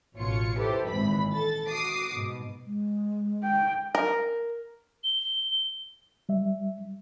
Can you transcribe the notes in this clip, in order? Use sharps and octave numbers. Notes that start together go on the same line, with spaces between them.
A1 B2 F4 C#5 C#7
E4 G4 A4 B4 C5
G#1 A#2 E3 B5
A4 A6
F#4 D6 D#6 C7
G#2 B2
G#3
G5
A#4
G7
G3 E5